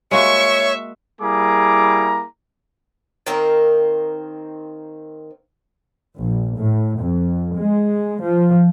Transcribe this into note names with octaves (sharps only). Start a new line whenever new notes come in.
G#3 A#3 F#4 C#5 E5 C#6 C#7
G3 A#3 E4 G#4 A#5 D6
D#3 A#3 C4 A#4
A#1
A2
F2
G#3
F3